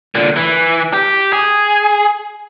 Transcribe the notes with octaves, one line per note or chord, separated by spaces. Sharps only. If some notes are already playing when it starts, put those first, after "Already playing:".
A#2 D3
E3
G4
G#4